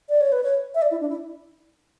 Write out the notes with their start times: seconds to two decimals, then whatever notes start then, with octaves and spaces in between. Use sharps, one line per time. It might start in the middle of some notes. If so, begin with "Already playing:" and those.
0.09 D5
0.21 C#5
0.32 B4
0.44 C#5
0.75 E5
0.82 D5
0.91 E4
1.01 D4
1.10 E4